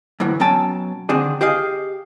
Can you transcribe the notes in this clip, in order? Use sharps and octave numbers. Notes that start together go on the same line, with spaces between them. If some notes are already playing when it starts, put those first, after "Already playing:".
F#2 A2 D3 E3
B2 F#3 C#4 G5 A5
D3 D#3 C4 D4 G#4
G4 G#4 D#5 F5